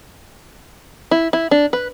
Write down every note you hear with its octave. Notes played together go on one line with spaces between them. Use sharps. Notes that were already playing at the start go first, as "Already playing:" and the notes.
E4
E4
D4
B4